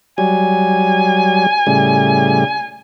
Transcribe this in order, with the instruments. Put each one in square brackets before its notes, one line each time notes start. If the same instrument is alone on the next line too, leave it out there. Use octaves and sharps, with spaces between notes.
[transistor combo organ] F#3 G3 [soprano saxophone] G#5
[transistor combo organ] A2 C#3 G3